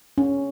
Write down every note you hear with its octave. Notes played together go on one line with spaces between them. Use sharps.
C#4